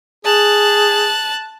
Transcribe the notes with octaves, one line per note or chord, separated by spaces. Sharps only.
G#4 A5 F#6